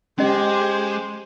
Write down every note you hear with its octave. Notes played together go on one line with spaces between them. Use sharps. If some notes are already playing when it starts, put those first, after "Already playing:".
G#3 C#4 G4 C5 D#5 G#5